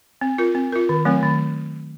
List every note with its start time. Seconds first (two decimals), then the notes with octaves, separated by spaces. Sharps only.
0.21 C4
0.38 F4 A#4
0.55 C4
0.72 F4 A#4
0.89 D#3
1.05 F#3 A3 C4
1.23 D#3